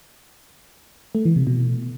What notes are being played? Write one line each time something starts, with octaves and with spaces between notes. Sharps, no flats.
A3
E3
C3
B2